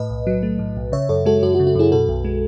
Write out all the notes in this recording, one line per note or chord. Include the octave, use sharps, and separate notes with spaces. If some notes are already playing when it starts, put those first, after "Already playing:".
Already playing: A2 B4 D#5
B1
F#3
A3
A2
B1
C#3 C#5 E5
F#2 A4 C#5
G#3 F#4 A4
F#2 F#4
F#4
C#3
F#4
F#2 E4 G#4
B2 F#4 A4
B1
G#3